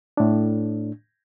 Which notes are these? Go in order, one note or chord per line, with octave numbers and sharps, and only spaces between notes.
A2 D4